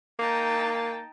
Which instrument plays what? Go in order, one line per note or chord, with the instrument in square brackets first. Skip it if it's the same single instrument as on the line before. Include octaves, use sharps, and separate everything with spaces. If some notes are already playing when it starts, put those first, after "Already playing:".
[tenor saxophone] A#3 [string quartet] D#4 G5 A5